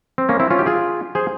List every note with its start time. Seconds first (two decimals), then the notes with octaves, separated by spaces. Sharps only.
0.18 C4
0.29 A#3 C#4
0.40 C4 E4
0.51 C#4 F4
0.59 G4
0.66 F4 G#4
1.15 G#4 C5